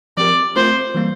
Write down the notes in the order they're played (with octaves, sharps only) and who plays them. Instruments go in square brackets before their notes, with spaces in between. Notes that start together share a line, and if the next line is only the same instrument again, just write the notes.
[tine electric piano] F3 C4 G4 A#4 [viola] D5
[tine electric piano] A3 C4 F4 A#4 [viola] C5
[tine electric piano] E3 G3 A#3